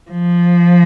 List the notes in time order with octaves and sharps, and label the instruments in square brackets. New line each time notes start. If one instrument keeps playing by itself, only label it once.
[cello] F3